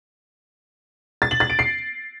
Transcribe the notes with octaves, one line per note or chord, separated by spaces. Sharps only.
A6
F#7
A6
D7
C7